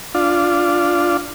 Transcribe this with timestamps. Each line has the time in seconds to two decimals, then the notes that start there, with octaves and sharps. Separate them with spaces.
0.15 D4 F4